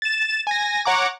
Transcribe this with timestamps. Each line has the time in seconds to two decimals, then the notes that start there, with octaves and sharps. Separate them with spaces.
0.02 A6 E7
0.47 G#5 A#6
0.85 C#5 F#5 A#5 D6